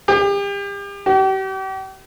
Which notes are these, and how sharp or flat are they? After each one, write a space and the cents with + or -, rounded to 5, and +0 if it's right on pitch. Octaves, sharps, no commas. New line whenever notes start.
G4 +35
G4 -40